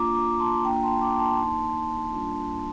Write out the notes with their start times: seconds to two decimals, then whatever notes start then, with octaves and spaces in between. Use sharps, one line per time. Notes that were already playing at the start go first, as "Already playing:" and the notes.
Already playing: A#3 D4 F4 A#5 D6
0.14 A#5 D6
0.39 A5 C6
0.64 A#3 D4 F4 G5 A#5
0.83 A5 C6
1.01 A#5 D6
1.19 A5 C6
1.38 A#3 D#4
2.12 G3 A#3 D4 F4